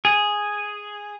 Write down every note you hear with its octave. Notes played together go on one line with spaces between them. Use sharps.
G#4